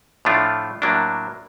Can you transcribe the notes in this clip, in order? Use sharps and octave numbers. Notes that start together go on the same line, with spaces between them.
A2 F3 A3 D4 F4
A2 F#3 A#3 D4